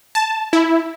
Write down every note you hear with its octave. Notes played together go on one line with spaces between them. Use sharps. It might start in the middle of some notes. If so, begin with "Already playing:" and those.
A5
E4